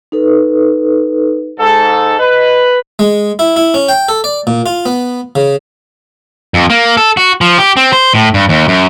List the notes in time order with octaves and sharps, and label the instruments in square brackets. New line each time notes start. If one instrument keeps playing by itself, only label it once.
[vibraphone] D#4 A4 B4
[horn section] G#2 A4
[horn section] B4 [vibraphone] D#5
[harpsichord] G#3
E4
E4
C#4
G5
A4
D5
A#2
F4
B3
C#3
[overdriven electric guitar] F2
A#3
A4
F#4
F3
G4
C4
C5
A2
G2
D#2
F#2